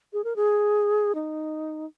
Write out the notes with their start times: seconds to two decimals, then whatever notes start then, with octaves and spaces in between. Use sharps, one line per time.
0.13 G#4
0.24 A#4
0.36 G#4
1.15 D#4